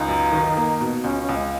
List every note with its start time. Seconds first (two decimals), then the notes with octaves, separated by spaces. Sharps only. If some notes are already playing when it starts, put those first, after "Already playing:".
Already playing: C#2 D#4
0.08 F#2
0.33 D#3
0.57 A#3
0.81 B2
1.04 C#2 C#4
1.20 C#4
1.29 C#2
1.36 G#3